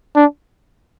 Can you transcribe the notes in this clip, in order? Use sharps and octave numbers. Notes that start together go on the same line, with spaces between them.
D4